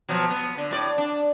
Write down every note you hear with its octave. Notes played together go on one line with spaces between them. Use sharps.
B2 F3 F#3
B3
D3
A2 D5
D4